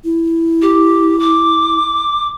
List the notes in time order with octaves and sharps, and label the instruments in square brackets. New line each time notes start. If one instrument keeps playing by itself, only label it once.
[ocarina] E4
[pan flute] G4
D6